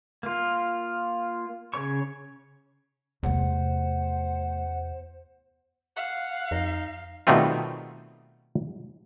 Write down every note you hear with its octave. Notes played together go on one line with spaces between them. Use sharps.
A#3 F4
C#3 C#5 C#6
E2 C3 A3 C5 F#5
F5 F#5
F2 D#4
B2 D#3 G3 A3 C4 F4